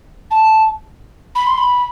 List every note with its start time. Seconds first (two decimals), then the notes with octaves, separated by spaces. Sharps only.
0.30 A5
1.35 B5
1.46 C6
1.57 B5